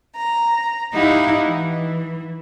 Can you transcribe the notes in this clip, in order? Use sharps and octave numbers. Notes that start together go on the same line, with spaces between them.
A#5
D#4 E4 G4 F5 F#5
E3